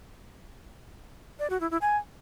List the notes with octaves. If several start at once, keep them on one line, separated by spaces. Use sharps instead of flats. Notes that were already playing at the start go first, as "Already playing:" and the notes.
D5
F#4
E4
E4
G#5